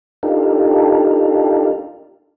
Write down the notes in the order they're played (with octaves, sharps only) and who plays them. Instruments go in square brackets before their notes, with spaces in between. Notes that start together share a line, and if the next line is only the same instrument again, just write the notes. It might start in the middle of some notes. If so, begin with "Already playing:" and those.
[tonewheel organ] D4 D#4 F4 G4 A4 A#4